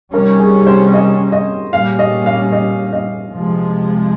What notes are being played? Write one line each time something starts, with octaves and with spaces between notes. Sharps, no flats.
C3 D#3 G3 C#4 A#4
G#4
C5
D#5
D#5
A#2 G3 C#4 F5
D#5
F5
D#5
D#5
C3 F3 G#3